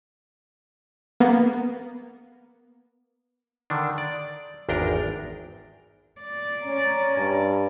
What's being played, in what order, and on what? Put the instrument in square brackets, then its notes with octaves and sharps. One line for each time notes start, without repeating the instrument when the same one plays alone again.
[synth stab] A#3 B3
[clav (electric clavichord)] D3 D#3 D4
D5
G#1 E2 D4 A#4 G5 A#5
[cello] D5
[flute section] C#4 A#5
[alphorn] G2